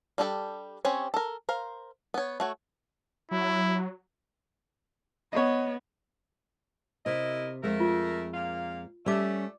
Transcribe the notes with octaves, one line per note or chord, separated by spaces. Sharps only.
G3 D4 G4 A4 G5
C4 C#4 G4 C#5
A4 A#4
A#4 C5 F5
B3 C#5
A3 F#4 C#5
F#3 E4
B3 C#5 D#5
C3 E4 A#4 D#5
F2 G#3 A3 A#4
F4
A#2 A#3 F5
G3 A3 C#4 D5 D6